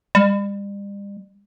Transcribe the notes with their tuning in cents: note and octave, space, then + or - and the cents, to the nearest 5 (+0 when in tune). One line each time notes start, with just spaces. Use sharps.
G3 +40